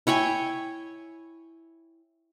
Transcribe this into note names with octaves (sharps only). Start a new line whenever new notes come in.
E4 C#5 G5 G#5